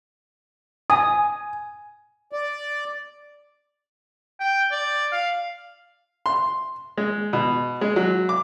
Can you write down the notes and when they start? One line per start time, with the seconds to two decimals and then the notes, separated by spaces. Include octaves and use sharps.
0.90 G#5 D#6
2.32 D5
4.40 G5
4.71 D5
5.12 F5
6.26 C6
6.98 G#3
7.33 B2
7.81 G#3
7.96 F#3
8.29 D6